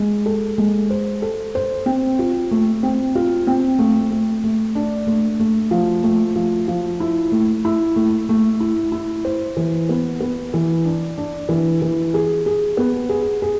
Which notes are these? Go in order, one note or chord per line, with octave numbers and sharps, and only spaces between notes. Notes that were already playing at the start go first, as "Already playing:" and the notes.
Already playing: G#3
A4
G#3
C5
A4
C5
C4
F4
A3
C4
F4
C4
A3
A3
A3
D4
A3
A3
F3
A3
F3
F3
E4
A3
E4
A3
A3
E4
E4
C5
E3
B3
B3
E3
D4
D4
E3
E3
G#4
G#4
B3
G#4
G#4